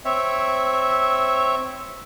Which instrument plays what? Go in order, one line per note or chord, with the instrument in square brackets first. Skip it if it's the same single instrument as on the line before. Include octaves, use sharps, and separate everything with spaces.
[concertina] C4 C#5 E5